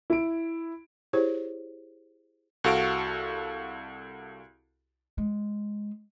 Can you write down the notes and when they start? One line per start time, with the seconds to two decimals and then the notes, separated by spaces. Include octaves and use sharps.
0.10 E4 D7
1.13 E4 G4 G#4 C5 C#5
2.64 C2 F#4 A4 F5 C#6 D7
5.18 G#3